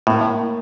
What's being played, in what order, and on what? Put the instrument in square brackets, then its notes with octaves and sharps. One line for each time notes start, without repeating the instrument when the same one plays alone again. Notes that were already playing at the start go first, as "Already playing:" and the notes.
[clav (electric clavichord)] A2 [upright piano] A#3